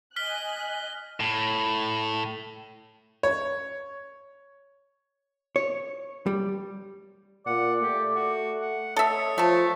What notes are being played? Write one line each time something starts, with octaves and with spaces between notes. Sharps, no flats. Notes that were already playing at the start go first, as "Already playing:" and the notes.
D#5 G#5 F6 F#6 B6 G7
A2
C#5
C#5
G3
A#2 D5 F#5
A3 G4
F#4
F#5
A4 C#5 D#5 E5
F3 A3 A5